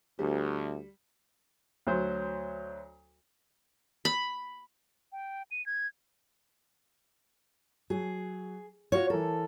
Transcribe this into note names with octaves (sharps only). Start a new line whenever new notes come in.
D2 G3
D2 F#3 C5
B5
G5
D#7
G#6
F#3 G#4
F4 F#4 C#5
E3 A4 A#4